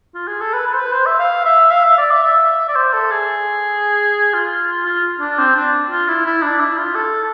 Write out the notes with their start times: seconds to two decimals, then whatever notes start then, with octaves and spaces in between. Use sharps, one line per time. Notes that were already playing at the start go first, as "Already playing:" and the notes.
0.14 F4
0.28 G#4
0.41 A4
0.54 B4
0.67 B4
0.74 C5
0.80 B4
0.93 C5
1.06 E5
1.19 F5
1.45 E5
1.71 F5
1.85 E5
1.98 D5
2.11 E5
2.24 E5
2.68 D5
2.76 C5
2.94 A4
3.11 G#4
4.34 F4
4.86 F4
5.20 D4
5.39 C4
5.55 D4
5.91 F4
6.08 E4
6.26 E4
6.42 D4
6.60 E4
6.78 F4
6.95 A4